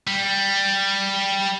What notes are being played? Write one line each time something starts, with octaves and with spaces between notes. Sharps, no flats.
G3